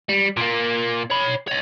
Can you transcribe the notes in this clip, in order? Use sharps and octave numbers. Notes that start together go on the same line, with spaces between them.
G3
A#2 A#3
C#5 B5
C#5 D#5